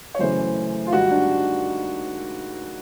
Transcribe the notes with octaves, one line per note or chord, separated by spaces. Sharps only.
C#5
F#2 C#3 E3 A3 C5
F4
G#2 D#3 G3 F#4
D4